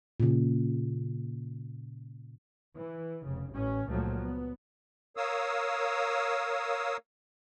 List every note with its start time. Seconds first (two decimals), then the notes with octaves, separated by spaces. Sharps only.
0.20 A#2 C#3
2.75 E3
3.25 F1 C#3
3.54 A1 A2 C#4
3.88 C#2 A#2 F3 F#3 A3
4.20 B3
5.17 A#4 C#5 F5 D#6 E6